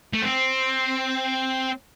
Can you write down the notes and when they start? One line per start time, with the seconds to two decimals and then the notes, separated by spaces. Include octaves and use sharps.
0.13 A3
0.22 C4